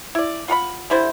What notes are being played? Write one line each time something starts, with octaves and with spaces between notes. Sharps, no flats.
E4 D5
F4 F#5 A#5 B5
D3 G3 E4 C5